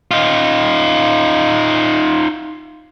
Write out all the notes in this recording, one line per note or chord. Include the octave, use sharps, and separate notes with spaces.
D#4 F4